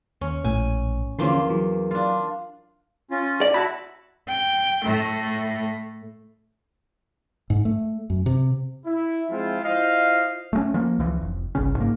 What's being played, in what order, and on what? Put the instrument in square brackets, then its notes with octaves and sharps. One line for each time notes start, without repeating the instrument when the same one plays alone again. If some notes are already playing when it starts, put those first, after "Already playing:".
[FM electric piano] D#2 [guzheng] C#4
[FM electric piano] A#1 A2 [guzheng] G#5
[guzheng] E2 A#3 C6 [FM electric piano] D3 F3 C#4
[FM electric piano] E3 F#3
[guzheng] D4 F4
[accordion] C#4 F4
[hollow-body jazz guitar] D5
[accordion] E4 F#4 A5 [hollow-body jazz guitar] B5
[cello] G5
A2 A3
[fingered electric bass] G#2
A3
F#2
C3
[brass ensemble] E4
F3 G#3 C4 E4 F4
E4 F4 C5 D#5 F5
[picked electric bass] A3 A#3 C#4
F3 A#3
C#2 E3 F3
F1
G1 C2 C#3 C#4
G#2 A#3